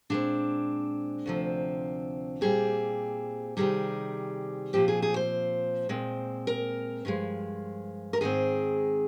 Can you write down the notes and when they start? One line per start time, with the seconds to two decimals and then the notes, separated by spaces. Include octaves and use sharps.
0.10 A#2 G#3 C4 D4
1.26 D2 C3 F3 C4
2.41 A#2 G3 C4 G#4
3.57 C3 D#3 G3 G#4
4.73 A#2 F3 C4 G4
4.88 G#4
5.02 G#4
5.16 C5
5.89 A#2 G#3 C4
6.47 A#4
7.05 G2 F3 G#3
8.13 A#4
8.21 G#2 D#3 G#3 C4 G#4